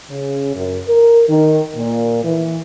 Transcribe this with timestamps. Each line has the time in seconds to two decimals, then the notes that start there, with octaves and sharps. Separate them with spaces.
0.10 C#3
0.56 F#2
0.88 A#4
1.29 D#3
1.77 A#2
2.24 E3